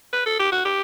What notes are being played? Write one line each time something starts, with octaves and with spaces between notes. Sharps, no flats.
B4
A4
G4
F#4
G4